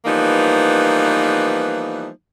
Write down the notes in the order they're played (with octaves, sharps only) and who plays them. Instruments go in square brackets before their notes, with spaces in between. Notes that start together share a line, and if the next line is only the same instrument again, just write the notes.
[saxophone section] E3 F3 G3 A#3 B3 D#4